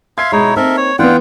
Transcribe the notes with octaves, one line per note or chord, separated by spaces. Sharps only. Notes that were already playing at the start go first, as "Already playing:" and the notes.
E5 F5 C6 G#6 C7
B2 G#3 D#4 E4 C#5
A#3 C4 D#4 A4 A#4 E5
C#5
E3 B3 D4 F4 F#5 G5